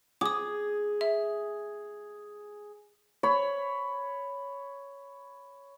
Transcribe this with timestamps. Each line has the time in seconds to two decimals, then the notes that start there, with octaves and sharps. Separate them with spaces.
0.21 G#4 D6 D#6
1.01 E5
3.23 C#5 B5